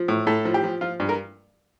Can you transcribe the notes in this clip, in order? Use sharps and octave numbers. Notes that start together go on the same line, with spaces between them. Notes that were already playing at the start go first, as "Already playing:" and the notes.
Already playing: F3
A2
A2 A4
F3
G4
F3
F3 F4
G2
A#4